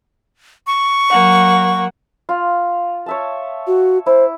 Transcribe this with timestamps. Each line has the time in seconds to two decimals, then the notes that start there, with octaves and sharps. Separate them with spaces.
0.67 C#6
1.09 F#3 A#3 F#5
2.29 F4
3.06 C#5 E5 A5
3.67 F#4
4.06 E4 C5